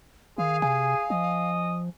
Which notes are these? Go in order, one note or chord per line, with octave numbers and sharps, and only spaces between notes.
D#3 G#4 F5
C3 F5 G#5
F3 D#5